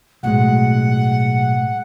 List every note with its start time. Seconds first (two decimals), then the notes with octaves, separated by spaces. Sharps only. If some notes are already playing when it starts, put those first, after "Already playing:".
0.23 B1 A2 G#3 F#5